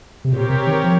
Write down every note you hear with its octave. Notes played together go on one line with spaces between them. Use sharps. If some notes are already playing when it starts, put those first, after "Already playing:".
C3
A#2 C4 G4 A#4 C#5
C3
D#3
F3